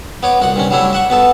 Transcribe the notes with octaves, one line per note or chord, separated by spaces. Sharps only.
B3 C#5 D6
C2 F#4 F#5
G2 C3 C#4
F#3 G3 A3 D4 E4 C#5
E5 F#5 C#6
B2 B3 A4